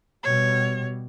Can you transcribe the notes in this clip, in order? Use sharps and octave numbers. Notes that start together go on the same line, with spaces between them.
B2 G3 C#5